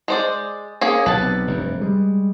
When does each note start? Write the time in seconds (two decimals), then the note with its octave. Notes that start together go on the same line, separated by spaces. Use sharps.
0.08 G#3 C5 D5
0.81 A#3 C#4 G#4
1.06 B1 C3 B4 A5
1.47 F1 G2
1.81 G3 G#3